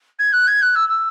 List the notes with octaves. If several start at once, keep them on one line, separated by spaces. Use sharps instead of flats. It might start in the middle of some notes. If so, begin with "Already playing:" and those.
G#6
F#6
G#6
F#6
E6
E6